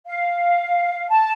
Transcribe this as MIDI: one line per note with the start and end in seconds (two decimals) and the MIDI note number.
0.07 1.09 77
1.09 1.32 81